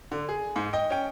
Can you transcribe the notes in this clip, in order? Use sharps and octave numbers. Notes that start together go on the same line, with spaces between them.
D3
G#4
G#2
D#5 G5
C#4 G5